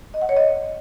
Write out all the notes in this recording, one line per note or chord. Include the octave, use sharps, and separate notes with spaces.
D#5
F#5
C#5
D#5